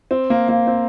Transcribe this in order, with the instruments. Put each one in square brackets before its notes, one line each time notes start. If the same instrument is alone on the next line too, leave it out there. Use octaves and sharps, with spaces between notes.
[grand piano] C4
A#3
A#3
C4